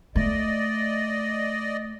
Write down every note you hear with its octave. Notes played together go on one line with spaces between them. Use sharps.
A3 D5 D#5